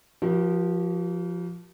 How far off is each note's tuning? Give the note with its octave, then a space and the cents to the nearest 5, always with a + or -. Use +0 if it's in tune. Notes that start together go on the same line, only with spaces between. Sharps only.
F3 +0 G4 -45 A#4 +40